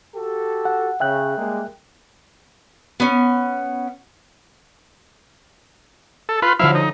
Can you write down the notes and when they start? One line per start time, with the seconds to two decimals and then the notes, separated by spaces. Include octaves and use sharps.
0.15 F#4 G4 A4
0.65 F#5
1.00 C#3 E5 G5 F#6
1.38 G3 G#3 A#3
3.00 B3 C#4
6.29 A4
6.42 F4 B4
6.59 D3 F3 F#3 E4 F5
6.75 D#4